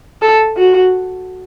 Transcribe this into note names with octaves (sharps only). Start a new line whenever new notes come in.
A4
F#4